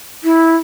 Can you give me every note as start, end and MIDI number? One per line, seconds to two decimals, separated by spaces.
0.24 0.57 64